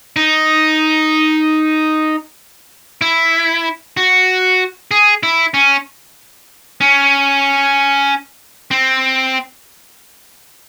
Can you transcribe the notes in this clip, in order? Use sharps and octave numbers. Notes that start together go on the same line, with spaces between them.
D#4
E4
F#4
G#4
E4
C#4
C#4
C4